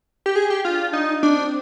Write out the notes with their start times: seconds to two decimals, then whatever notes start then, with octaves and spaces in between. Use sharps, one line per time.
0.26 G4
0.36 G#4
0.50 G4
0.64 D4 F4
0.93 D#4
1.23 C4 D4